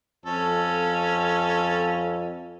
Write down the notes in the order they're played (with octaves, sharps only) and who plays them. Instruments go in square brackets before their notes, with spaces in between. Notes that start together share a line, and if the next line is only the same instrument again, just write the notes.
[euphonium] F2 [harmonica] C#4 A4